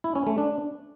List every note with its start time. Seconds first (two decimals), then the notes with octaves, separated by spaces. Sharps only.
0.04 E4
0.15 C#4
0.27 A3
0.38 D4